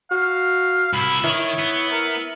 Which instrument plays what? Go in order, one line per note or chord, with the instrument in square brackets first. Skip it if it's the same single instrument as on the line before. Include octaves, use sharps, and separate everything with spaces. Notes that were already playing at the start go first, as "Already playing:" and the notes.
[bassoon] F#4 [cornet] F5
[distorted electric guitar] C2 E4 [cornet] B5
[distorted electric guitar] D#3 [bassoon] E4 [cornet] C#5
[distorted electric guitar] B3
[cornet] A#4